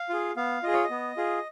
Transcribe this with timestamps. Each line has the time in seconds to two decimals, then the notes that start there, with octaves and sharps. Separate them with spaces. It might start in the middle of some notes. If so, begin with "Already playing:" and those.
Already playing: F5
0.09 F4 G#4
0.36 B3 F5
0.63 F4 G#4 D#5
0.73 C#5
0.84 D#5
0.90 B3
1.17 F4 G#4